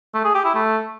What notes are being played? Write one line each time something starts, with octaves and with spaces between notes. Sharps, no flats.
A3
G#4
G4
E4
A3